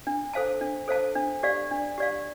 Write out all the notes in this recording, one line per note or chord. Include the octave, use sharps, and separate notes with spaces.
D4
A4 C5 F5 A5
D4
A4 C5 F5 A5
D4
G4 D5 F5
D4
G4 D5 F5